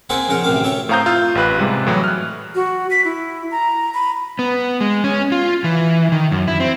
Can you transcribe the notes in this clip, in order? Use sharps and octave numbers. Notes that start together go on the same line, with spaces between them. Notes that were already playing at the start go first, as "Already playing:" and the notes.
A#3 C4 D#4 G#4 E5 F#5
A#1 C#3 A#4 F#5
A1 D2 C3 D#3 F5 D6
A4 C#5 E5 G5
A2 C4 F5 A#5 D#6 G6
F4 E6 G6
A1 G4 B4 F#6
G#2 C3 G3 G#3
A2 E3 F#3
F6 F#6
F#4
B6
E4
A#5
B5
B3
G#3
C#4
F4
E3
D#3
F#2
E4
C4